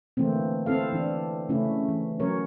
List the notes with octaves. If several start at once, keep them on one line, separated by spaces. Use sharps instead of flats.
D3 E3 A3 A#3 C4
C4 E4 A4 F5
E3 D4
C#3 A3 C#4 E4
E3
F#3 C#4 A#4 C#5